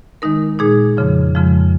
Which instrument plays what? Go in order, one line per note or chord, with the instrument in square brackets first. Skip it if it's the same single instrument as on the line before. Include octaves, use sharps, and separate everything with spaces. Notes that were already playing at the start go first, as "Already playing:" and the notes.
[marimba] D#3 G#3 D#4 A#4
A#2 G#3 D#4 G#4
F2 C#3 F3
F2 C#3 F3 G#3